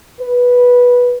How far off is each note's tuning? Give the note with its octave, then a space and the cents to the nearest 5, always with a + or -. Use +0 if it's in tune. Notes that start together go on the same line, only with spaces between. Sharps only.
B4 -10